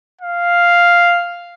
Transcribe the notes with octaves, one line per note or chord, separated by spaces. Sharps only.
F5